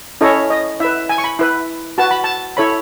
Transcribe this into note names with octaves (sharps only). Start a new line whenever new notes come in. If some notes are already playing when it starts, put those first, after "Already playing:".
C#4 E4 A4 C#5 D#5
D#5
E4 B4 E5
G#5
C#6
B5
E4 B4
F#4 B4 A5
B5
A5
E4 A4 C#5 B5